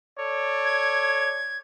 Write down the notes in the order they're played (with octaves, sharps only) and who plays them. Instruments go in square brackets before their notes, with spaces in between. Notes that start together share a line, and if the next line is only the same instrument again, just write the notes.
[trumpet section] A4 C#5 D5
[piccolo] G#6